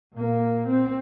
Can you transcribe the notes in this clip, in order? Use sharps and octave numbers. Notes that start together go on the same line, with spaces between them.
A#2 A#3
C4